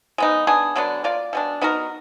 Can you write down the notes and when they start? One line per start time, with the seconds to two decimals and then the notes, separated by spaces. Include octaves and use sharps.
0.18 G#3 B3 D#4
0.47 B3 D4 G#4
0.76 D3 F#3 B3 D4
1.04 A#3 F4 A#4 D5
1.33 B2 G#3 D4
1.61 B3 D#4 F#4 A#4